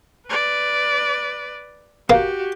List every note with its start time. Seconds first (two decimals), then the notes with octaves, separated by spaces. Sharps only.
0.27 B4 D5
2.10 A#3 F#4 G4